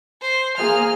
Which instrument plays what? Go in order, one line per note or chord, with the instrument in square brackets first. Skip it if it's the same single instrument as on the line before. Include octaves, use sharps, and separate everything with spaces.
[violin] C5
[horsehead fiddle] A#3 G#4 [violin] F6